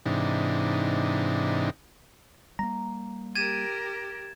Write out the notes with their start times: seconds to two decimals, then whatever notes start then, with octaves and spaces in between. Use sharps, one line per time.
0.05 G#2 C3 E3 D4 D#4
2.59 G3 A3 A#3 A#5
3.35 G4 A#4 G#6 A6 D#7 E7